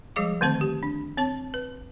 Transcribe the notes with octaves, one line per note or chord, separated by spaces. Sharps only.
F3 G3 G#3 G#4 F5 D6
D3 D#3 A3 C4 C5 A5
G4
D4
C4 C#5 A5
B4